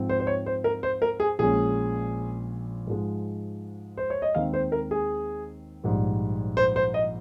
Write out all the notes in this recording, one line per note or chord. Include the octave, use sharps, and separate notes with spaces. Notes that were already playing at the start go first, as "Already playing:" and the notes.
Already playing: G#2 F3 C4
C5
C5
C#5
C5
A#4
C5
A#4
G#4
A#1 A#2 G#3 C#4 G#4
G#2 F3 G#3
C5
C#5
D#5
D#2 D#3 G#3 C4 D#4 F5
C5
A#4
G#4
A#1 G#2 G3
C5
C5
D#5